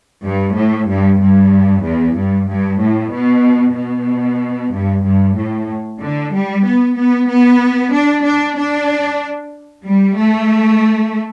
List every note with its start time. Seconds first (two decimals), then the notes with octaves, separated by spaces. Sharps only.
0.24 G2
0.55 A2
0.88 G2
1.21 G2
1.84 E2
2.17 G2
2.48 G2
2.80 A2
3.13 B2
3.76 B2
4.72 G2
5.04 G2
5.37 A2
6.01 D3
6.33 G3
6.65 B3
6.97 B3
7.28 B3
7.93 D4
8.25 D4
8.58 D4
9.85 G3
10.17 A3